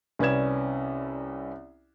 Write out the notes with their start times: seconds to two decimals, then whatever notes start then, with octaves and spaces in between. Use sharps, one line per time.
0.19 C2 C#4 B4 D5 G#6 E7